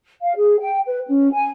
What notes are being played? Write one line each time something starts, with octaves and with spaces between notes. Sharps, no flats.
F5
G#4
G5
B4
C#4
G#5